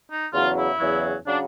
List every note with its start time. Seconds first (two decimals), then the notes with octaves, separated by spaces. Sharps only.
0.10 D#4
0.33 E2 C#3 F#3 F4
0.56 E4
0.79 E2 C#3 F#3
1.26 C#3 F#3 D4